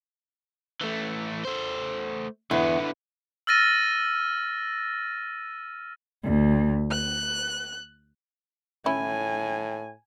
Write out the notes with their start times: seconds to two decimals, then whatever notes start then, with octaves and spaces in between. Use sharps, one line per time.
0.81 E3 A3
1.45 A3 C5
2.51 E2 D3 B3
3.47 E6 F6 A6 A#6 D#7
6.23 D2
6.90 F#6
8.86 A2 C#4 E4 G#5